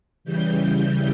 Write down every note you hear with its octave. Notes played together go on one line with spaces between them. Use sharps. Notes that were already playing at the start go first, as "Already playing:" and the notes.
C#3 E3 G3 G6